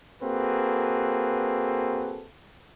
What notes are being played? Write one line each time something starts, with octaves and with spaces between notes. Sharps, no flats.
A#3 C4 F#4 G#4 A4 B4